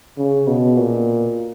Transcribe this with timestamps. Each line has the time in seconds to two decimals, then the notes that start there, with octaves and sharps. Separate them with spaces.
0.18 C#3
0.47 B2
0.77 A#2